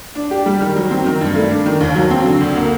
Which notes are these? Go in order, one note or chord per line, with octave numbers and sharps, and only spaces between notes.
D4
G4
G3
D#3
F#3
C4
D#3
G2
A3
D4
D#3
D#2
F#3
C4
D3
D2
A#3